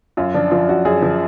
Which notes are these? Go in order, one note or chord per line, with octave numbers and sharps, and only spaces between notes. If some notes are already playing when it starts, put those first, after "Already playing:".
F#2 F4
F3 D4
F3 F4
F#2 F#4
F#2 G#4
F3